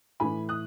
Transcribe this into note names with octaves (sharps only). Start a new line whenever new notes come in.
A2 E3 G#5 B5
D#6 F#6